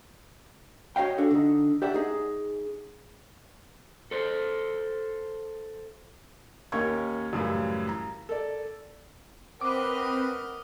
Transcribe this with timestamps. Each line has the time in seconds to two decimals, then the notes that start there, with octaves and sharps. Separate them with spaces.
0.96 F#4 C#5 D#5 F5 G5
1.18 C#4 D4 F#4 A4
1.31 D3 D#4
1.82 G4 D5 E5 F#5
1.94 D#4 G#4
4.11 A4 C5
6.72 D#2 C#4 D#4 A#4 C#6 G#6
7.33 F#2 A2 C#3 E3 G3
7.89 A#5
8.29 A4 D5
9.61 C4 A#4 B4 D#5 F#5 D6 F6